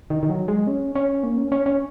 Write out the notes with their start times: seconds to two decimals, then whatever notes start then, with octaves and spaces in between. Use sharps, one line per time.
0.10 D#3
0.23 D#3
0.30 F#3
0.48 G#3
0.67 C#4
0.95 C#4
1.23 A#3
1.38 C#4
1.52 C#4
1.66 C#4